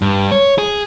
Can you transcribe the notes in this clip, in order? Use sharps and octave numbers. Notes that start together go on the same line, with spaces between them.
G2
C#5
G#4